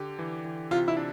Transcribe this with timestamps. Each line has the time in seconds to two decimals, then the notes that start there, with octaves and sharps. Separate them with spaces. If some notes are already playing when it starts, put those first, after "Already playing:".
Already playing: D3 G4
0.19 E3
0.45 E3
0.71 C3 F4
0.88 E4
0.97 D4